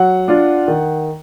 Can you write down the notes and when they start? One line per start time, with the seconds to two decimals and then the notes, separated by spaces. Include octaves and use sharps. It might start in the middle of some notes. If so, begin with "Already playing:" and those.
Already playing: F#3 F#5
0.28 D4 F4
0.68 D#3